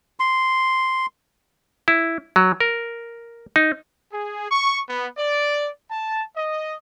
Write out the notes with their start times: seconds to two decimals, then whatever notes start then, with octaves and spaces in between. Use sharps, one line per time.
0.20 C6
1.88 E4
2.36 F#3
2.61 A#4
3.56 D#4
4.12 G#4
4.51 C#6
4.88 B3
5.17 D5
5.91 A5
6.36 D#5